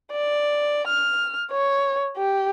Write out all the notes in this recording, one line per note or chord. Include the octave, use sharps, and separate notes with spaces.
D5
F6
C#5
G4